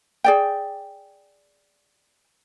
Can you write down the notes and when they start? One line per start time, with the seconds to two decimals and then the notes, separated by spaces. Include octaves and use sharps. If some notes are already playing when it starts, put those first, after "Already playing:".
0.24 G#4 D5 G5